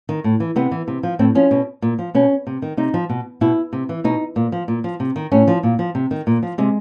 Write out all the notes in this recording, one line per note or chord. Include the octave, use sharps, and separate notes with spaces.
D#3
A2
E3
C3 B3
E3
C3
F3
A2 C4
F3 C#4
B2
A#2
F3
B2 C#4
C3
D#3
C3 D#4
F3
B2
B2 E4
C3
E3
B2 D#4
A#2
F3
A#2
F3
C3
D#3
A2 C#4
F3
A#2
F3
C3
D#3
A#2
F3
C3 G#3